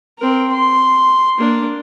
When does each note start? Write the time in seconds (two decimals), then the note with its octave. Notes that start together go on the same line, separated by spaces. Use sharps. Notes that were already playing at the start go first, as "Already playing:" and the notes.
0.19 C4 A#4
0.52 C6
1.38 A#3 D4